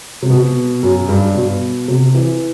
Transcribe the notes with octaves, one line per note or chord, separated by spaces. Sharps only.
C3
B2
F#2
G2
B2
C3
E3